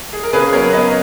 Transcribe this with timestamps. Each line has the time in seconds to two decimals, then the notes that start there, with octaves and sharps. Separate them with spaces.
0.13 G#4
0.24 A#4
0.33 C#3 G#4 B4
0.53 F#3 B3 A#4 C#5
0.73 C#3 B4 D#5